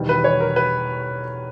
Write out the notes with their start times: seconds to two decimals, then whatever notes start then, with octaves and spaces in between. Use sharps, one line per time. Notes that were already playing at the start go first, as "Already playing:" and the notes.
Already playing: E1 E2 D#3 G3
0.09 B4
0.24 C#5
0.41 A#4
0.56 B4